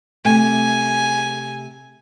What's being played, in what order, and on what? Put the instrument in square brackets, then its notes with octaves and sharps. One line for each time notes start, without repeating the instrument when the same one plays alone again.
[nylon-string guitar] C3 A3 [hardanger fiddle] G#5